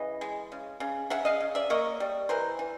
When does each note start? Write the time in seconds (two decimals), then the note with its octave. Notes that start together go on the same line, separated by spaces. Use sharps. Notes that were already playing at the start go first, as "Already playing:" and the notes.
Already playing: C#3 E3 D#5
0.21 G#3
0.52 C#3
0.80 C#3
1.10 C#3 E5 F#5
1.25 D#5 F5
1.41 C#3
1.55 D5 E5
1.70 A#3 C#5 D#5
2.00 G3
2.29 E3 A#4 C5
2.59 E3